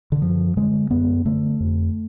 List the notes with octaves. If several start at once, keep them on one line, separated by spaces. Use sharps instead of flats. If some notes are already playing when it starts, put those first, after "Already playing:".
D3
F#2 F3
D3 G#3
F#2 B3
D3 A3
F2